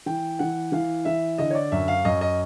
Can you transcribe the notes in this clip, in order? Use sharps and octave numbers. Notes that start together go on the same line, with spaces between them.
E3 G5
E3 F#5
E3 F5
E3 E5
D3 D#5
C#5
D5
F#2 E5
F5
F#2 D#5
D#5